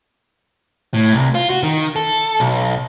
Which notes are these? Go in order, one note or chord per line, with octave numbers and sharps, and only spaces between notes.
A2
C2
F4
F#4
D#3
A4
B1